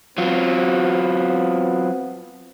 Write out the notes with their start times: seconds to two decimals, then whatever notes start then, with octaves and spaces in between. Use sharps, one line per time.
0.18 F#3 B3 C4 F4